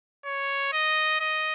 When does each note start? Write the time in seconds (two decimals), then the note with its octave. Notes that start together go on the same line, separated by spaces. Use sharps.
0.25 C#5
0.73 D#5
1.21 D#5